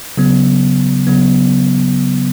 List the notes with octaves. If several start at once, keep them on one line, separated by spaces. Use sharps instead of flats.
C#3 F#3 B3
C#3 F#3 B3